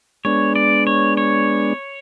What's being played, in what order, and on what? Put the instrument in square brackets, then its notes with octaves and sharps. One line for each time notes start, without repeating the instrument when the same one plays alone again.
[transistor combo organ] G#3 B3 D4 [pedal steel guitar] C#5
[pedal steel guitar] D5
C#5
C#5